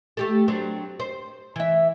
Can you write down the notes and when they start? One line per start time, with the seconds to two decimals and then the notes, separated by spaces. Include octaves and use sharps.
0.17 A3 G4 A4
0.48 F#3 C4 D4
1.00 C5
1.56 E3 E5